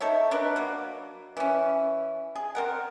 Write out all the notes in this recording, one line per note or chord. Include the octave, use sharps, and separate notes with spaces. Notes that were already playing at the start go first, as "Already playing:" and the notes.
D#4 A4 C#5 E5
D4 A#4 B4
F#3 A#3
E3 C#4
G#4
C4 A#4 F#5